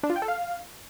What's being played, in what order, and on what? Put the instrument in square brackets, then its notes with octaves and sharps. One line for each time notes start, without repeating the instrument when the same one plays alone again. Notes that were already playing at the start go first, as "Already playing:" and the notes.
[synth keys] D4
F4
G5
A4
F5